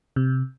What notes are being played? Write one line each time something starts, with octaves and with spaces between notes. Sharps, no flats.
C3